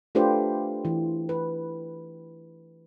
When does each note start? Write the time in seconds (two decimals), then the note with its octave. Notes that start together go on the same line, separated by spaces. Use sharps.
0.15 A3 D4 F4 G4 B4 C5
0.85 E3
1.29 B4